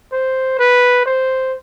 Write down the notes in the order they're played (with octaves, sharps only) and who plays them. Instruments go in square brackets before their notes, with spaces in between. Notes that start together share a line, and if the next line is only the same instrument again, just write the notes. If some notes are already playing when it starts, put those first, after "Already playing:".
[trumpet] C5
B4
C5